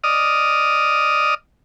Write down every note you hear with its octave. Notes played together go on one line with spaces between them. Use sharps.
D5 D#5 D#6 F6